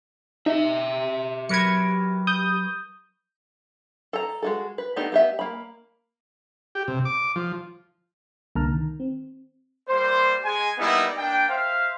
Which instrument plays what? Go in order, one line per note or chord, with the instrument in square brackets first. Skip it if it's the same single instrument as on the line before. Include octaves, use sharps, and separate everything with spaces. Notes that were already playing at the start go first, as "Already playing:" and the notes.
[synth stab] D#4 [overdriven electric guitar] G4 E5
[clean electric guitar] F#3 A#4 B4 [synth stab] G#6 C#7
[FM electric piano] D#6 G6
[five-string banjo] A4 A#5
G#3 F#4 A4
B4
A3 B3 D4 D#4 G4
B3 G4 E5
A#3 B5
[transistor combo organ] G4
C3
D6
F3
[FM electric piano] C2 D3 A#3 A5 A#5 F6
D#3
C4
[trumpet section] G3 A#3 C5
G#3 G#5
G3 A#3 B3 D#4 E4
A#3 D4 G5
C5 E5 F5